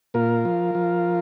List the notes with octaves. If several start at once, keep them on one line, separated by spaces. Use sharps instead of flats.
A#2 F4 A#4
F3
F3